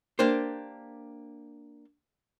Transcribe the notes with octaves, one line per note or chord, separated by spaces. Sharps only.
A#3 D4 G4 C5